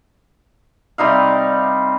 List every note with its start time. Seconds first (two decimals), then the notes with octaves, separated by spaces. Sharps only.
0.98 C3 G3 D#4 F5